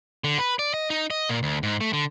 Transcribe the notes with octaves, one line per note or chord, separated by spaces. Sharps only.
D3
B4
D5
D#5
D#4
D#5
A#2
D2
G#2
A3
D3